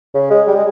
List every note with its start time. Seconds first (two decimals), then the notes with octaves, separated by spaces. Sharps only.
0.14 C#3
0.30 G#3
0.47 G3
0.55 G#3